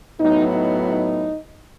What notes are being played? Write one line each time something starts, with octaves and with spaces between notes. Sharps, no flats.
A2 F#3 B3 D#4
D#4
D#4